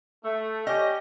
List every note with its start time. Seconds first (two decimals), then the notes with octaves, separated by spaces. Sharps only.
0.24 A3
0.67 C#4 G4 D#5